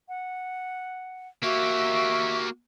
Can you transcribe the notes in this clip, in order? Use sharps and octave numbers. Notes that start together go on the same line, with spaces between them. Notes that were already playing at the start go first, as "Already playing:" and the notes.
F#5
A#3 F#4 G4 E5 C#6